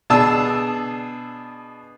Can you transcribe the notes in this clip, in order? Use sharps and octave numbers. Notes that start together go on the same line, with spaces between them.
B2 D4 G#4 A5 E6